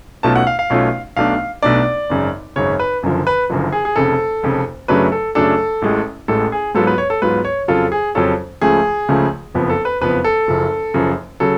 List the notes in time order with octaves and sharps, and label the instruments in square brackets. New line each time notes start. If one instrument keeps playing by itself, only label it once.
[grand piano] B1 B2 A3 C#4 F4 A5
F#5
F5
F5
B1 B2 A3 C#4 F4
B1 B2 A3 D4 F5
B1 B2 A3 D4 D5
G#1 F#2 C#3
G#1 F#2 C#3 C#5
B4
F#1 F#2 D3 F3
B4
F#1 F#2 D3 F3
G#4
G#4
F1 F2 C#3 A4
F1 F2 C#3
F#2 C#3 F#3 A3 D4 B4
A4
F#2 C#3 F#3 A3 D4 A4
A1 A2 G#3
A1 A2 G#3 A4
G#4
G#2 F#3 B3 F4 A4
B4
C#5
A4
G#2 F#3 B3 F4 B4
C#5
F2 C#3 F#3 C#4 F4 A4
G#4
F2 C#3 F#3 C#4 F4 A4
C#2 C#3 F3 A3 G#4
C#2 C#3 F3 A3
F#1 F2 F3 B3
A4
B4
F#1 F2 F3 B3 B4
A4
F#1 F#2 C#3 F3
F#1 F#2 C#3 F3
C#3 F#3 A4